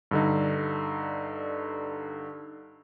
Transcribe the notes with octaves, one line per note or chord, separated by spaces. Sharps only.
G2 D3 D#4